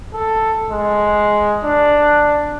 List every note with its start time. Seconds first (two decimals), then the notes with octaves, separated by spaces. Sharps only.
0.14 A4
0.70 G#3
1.65 D4